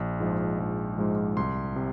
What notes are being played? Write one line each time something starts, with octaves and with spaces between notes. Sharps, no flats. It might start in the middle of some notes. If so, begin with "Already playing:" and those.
Already playing: A#1
G#2 F3 G#3
A#1
G#2 F3 G#3
C2 C6
C3